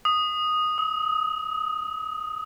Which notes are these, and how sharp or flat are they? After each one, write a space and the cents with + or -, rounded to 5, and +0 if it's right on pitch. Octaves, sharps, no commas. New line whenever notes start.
D#6 -5
D#6 +40